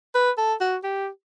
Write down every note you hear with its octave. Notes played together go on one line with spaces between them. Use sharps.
B4
A4
F#4
G4